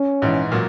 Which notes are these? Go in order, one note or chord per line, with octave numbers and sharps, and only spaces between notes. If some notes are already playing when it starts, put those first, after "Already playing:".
Already playing: C#4
A#1 G#2 E3
A#2 F#3